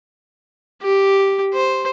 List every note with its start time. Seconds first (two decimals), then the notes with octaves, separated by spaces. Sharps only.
0.82 G4
1.54 C5